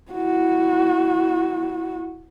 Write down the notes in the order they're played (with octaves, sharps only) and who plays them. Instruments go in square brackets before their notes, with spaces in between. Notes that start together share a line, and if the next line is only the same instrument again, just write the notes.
[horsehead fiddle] E4 F#4